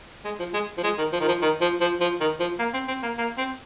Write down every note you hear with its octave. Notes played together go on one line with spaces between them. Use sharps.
G#3
F3
G#3
F3
G#3
D#3
F3
D#3
F3
D#3
F3
F3
F3
D#3
F3
A#3
C4
C4
A#3
A#3
C4